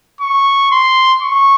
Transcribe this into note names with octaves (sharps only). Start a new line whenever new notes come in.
C#6
C6
C#6